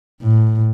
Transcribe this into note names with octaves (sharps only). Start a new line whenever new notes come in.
A2